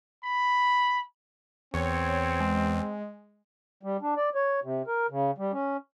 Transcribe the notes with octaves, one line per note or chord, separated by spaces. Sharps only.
B5
E2 C4 C#5
G#3
G3
D4
D5
C#5
C3
A#4
C#3
G3
C#4